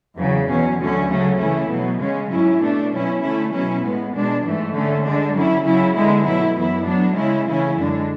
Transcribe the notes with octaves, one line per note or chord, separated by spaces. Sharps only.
E2 C#3 F#3
E2 B2 F#3 C#4
D2 D3 F#3 A3 C#4
C#3 F#3 A3 C#4
C#3 E3 A3 C#4 E4
B2 F#3 B3
C#3 G#3 C#4
G#2 F#3 C#4 E4
B2 A3 D4
B2 F#3 C#4 E4
D3 A3 C#4 E4
B2 F#3 C#4 E4
A2 G#3 B3
B2 G#3 D4
G#2 E3 A3
D3 A3 C#4
D3 G#3 D4
D3 F#3 C#4 E4
C#3 F#3 C#4 E4
D3 G#3 B3 E4
B2 F#3 A3 E4
F#2 E3 B3 E4
A2 F#3 B3 D4
C#3 G#3 C#4 E4
C#3 E3 A3 C#4 E4
F#2 D3 G#3 D4